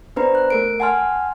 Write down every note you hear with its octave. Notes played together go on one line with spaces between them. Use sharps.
B3 D4 B4 C5 A#5
F#6
A3 A#4 D7
F#5 G#5 A5 C6 F6